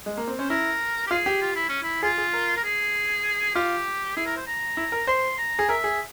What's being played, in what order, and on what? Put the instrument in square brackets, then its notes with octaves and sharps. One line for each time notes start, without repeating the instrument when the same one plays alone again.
[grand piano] G#3
A#3
C4
[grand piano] C#4 [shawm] C5
[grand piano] E4 [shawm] A#4
[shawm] G4
[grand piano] F4 [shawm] G#4
[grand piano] G4
[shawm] F4
E4
C#4
E4
[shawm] F4 [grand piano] G#4
[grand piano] G#4
A#4
[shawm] A#4
G#4
[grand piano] F4 [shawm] G4
[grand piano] E4 [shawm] G#4
[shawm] A#4
C5
A#5
[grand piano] E4
A#4
[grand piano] C5 [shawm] C6
[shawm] A#5
[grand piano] G#4
[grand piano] A#4 [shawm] E5
[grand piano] G#4